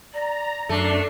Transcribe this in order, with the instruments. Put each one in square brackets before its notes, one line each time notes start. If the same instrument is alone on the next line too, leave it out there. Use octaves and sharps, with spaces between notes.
[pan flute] D5 [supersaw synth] A#5
[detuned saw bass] F#2 [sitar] A3 [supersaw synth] D4 C7